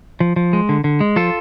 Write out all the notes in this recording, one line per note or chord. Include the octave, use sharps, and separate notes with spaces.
F3
F3
G#3
D3
D3
G#3
F3 F4 A4